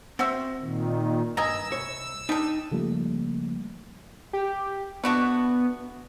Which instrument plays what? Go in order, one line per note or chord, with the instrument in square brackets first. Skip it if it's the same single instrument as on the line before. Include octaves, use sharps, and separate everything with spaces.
[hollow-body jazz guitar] C4 [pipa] F#4 C5 E5
[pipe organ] A#2 D#3
[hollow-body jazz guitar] G2 [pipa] D#5 G#5 A#5 [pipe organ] E6
[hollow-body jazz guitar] C2 C#5
[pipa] G3 D4 [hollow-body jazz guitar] D#4
[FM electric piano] C#3 F3 G3 A3 A#3
[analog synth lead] G4
[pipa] A3 D4 F#4 [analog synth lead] B3